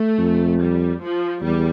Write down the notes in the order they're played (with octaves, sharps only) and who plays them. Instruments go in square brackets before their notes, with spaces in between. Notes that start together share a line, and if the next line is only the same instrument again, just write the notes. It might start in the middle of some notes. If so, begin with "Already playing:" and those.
Already playing: [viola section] A3
[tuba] F2
[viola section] G3
F3
[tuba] E2 [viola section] G3